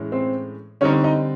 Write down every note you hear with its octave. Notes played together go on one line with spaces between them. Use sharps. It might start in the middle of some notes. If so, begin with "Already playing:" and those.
Already playing: A2 E3 G#3 C#4
C4 C5
D3 G3 C4 C#4 D#4 C#5
D#4 D#5